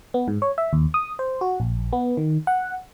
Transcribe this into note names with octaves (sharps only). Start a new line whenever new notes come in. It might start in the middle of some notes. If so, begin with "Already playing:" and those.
B3
G#2
C#5
E5
D#2
D#6
C5
F#4
A#1
B3
D#3
F#5